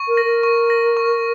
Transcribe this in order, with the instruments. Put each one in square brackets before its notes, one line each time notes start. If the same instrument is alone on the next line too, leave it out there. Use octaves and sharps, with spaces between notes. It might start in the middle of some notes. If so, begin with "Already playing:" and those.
Already playing: [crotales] C#6
[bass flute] A#4
[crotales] A#6
[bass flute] A#4
[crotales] C#6
A#6
C#6